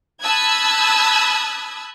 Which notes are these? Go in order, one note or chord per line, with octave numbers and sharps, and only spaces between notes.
A5 B5 D#6 E6 F#6 G#6